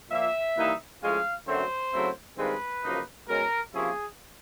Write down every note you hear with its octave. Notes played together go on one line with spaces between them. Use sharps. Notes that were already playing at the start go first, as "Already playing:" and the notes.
A#2 F3 A#3 E5
E3 G3 A#3 D#4
A2 F3 G#3 C#4 F4 F5
F#2 D3 F#3 A3 C4 C5
C#3 F#3 A3 C4 E4
G2 D#3 G#3 C4 F4 B4
F#2 C#3 F3 A#3 D#4
B2 G#3 C#4 A#4
C3 F3 A#3 C#4 E4 G#4